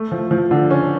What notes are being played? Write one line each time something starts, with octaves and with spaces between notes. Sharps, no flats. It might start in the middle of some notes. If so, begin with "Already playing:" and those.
Already playing: A3
F3
F3
D3
C#4